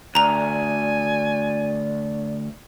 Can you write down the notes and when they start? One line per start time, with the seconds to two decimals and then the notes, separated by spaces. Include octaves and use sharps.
0.15 D2 D5 G#5 A#5 F7